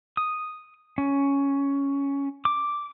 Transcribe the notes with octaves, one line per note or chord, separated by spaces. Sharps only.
D#6
C#4
D6